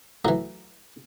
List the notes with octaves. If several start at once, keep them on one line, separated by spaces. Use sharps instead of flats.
A2 E3 F#3